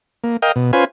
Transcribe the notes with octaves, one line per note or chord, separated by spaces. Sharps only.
A#3
A#4 D#5 F5 G5
B2
C#4 F4 B4 C5 G#5